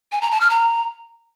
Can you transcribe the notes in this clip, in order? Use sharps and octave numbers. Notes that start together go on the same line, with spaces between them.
G#5
A#5
A5
F6
A#5